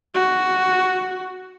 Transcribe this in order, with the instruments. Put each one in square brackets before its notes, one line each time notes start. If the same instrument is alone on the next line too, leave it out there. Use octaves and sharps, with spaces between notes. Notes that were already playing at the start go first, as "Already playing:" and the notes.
[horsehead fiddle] F#4